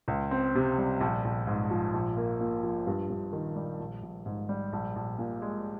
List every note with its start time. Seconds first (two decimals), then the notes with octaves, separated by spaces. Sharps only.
0.08 C#2
0.31 C4
0.55 C3
0.78 G3
1.00 A#1
1.25 A#1
1.47 G#2
1.71 F3
1.94 A#1
2.17 A#3
2.40 A#2
2.63 F3
2.87 G2
3.10 G2
3.33 D#3
3.56 G3
3.80 A#1
4.03 A#1
4.26 G#2
4.49 G3
4.73 A#1
4.96 A#1
5.18 A#2
5.42 G#3